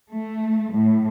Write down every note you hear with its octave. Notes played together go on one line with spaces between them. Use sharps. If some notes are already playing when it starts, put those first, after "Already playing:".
A3
A2